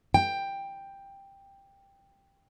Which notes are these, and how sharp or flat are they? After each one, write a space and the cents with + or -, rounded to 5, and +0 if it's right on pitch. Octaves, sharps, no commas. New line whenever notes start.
G5 +10